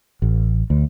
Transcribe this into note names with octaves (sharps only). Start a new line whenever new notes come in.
A1
D2